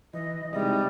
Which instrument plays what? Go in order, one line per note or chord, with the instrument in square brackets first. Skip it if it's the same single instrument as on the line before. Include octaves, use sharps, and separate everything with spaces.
[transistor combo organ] E3 [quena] D#5
[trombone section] C3 G#3 D#4 [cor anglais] G3 [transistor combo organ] E4 D#5 [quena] D5